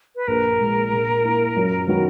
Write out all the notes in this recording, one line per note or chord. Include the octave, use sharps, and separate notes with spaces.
B4
A#1 A#4
A#2 G#3
A#2
A#3 E4
F#2
D#3 F#3 B3 F#4